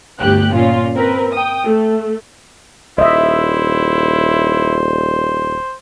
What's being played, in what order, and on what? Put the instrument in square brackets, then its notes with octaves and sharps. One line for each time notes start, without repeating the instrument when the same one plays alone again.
[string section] G1 D2 G4 F#6
A#2 C#4 F4
C4 A#4 B4
G5 D#6
A3
[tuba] D#1 [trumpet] E4 [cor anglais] C5 [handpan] D#5 E5